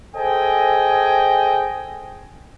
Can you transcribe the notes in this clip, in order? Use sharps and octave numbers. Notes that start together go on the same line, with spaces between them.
G#4 A4 C5 D#5 G5 G#5